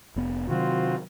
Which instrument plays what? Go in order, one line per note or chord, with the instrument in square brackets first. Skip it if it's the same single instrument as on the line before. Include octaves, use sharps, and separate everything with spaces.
[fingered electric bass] F1 B3
[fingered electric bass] C3 D#3 F#3 [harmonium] C4 F4 F#4